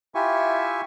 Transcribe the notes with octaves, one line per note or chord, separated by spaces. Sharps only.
E4 F4 G4 E5 G#5 C#6